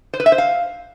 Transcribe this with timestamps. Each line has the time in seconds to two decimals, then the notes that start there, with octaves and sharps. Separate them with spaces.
0.14 C5
0.20 B4
0.26 E5
0.32 C5
0.38 F5